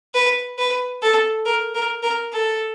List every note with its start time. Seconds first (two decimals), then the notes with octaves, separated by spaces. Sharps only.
0.14 B4
0.58 B4
1.02 A4
1.46 A#4
1.75 A#4
2.03 A#4
2.33 A4